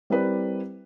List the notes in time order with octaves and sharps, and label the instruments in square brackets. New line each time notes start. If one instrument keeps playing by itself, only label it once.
[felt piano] G3 C4 E4 A#4 B4 D5